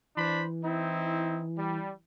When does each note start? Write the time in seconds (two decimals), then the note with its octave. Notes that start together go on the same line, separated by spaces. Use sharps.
0.17 E3 D4 C5 B5
0.63 C4 D#4 E4
1.58 G3